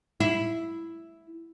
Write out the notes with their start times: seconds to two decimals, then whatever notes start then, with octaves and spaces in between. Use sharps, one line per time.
0.20 E4